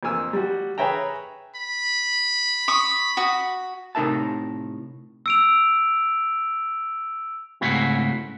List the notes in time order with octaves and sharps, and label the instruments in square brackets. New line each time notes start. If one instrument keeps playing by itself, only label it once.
[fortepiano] F2 A#3 A#4 G#5 E6
G3 F#4
G#4 B4 C#5 E5 G5 A#5
[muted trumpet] B5
[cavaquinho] C#6 D#6
F#4 D#6
[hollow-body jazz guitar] A2 C3 D#4 A#4 E5 A5
[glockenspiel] E6 D7 F7
[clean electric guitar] G#2 C#3 A3 C4 E4 F#4